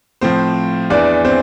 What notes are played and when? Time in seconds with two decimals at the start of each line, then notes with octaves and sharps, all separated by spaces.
0.21 A2 F3 C4 C5
0.90 E2 E3 D4 D5
1.25 C4 C5